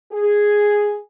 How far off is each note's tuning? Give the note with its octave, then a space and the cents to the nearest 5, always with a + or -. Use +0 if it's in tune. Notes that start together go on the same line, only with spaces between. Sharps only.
G#4 +0